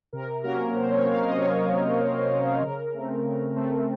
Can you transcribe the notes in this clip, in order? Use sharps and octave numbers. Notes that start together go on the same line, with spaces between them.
C3 A#4
F#3 A#3 C#4 A#4
C3 C5
C#5
F#3 A#3 C#4 F5
D#5
C3 C#5
F#3 A#3 C#4
C3
F#3 A#3 C#4
C#3 A#4
A3 C4
C#3
A3 C4